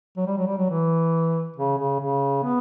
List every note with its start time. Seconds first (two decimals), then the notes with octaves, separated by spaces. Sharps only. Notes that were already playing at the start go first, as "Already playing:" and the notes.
0.17 F#3
0.26 G3
0.37 F#3
0.47 G3
0.58 F#3
0.70 E3
1.56 C#3
1.78 C#3
1.99 C#3
2.43 B3